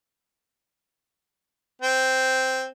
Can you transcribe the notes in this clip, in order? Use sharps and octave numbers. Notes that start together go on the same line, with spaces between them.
C4